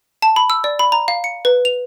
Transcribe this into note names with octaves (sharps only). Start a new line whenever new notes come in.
A5
B5
E6
D5
B5
A#5
F5
C#7
B4
F7